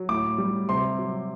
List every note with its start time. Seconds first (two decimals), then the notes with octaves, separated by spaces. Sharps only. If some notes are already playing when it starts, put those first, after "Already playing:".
Already playing: F#3
0.09 A2 D6
0.38 G3
0.69 C3 C6
0.99 F#3